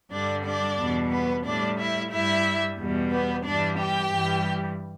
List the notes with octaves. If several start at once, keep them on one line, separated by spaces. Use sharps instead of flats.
G2 D3 G3 D4 D5
D4 D5
E2 B2 G3
B3 B4
A2 G3 D4 D5
E4 E5
G2 G3 E4 E5
E2 B2 G3
B3 B4
G2 E3 G3 D4 D5
G4 G5
G2 E3 G3